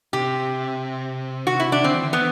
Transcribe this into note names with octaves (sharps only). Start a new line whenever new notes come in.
C3 G4
F#4
E4
D4
D3 C4
E3
D3
E3 B3